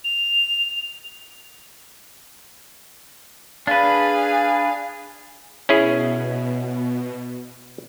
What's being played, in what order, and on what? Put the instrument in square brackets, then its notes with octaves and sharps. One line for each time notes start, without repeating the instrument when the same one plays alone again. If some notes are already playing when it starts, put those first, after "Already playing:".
[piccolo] F7
[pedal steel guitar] D4 B4 [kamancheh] G#4 F5
[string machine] B2 [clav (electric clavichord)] C#4 E4 G#4